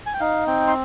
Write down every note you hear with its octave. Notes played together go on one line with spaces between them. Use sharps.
G#5
G5
D#4 F5
C4 G5
C6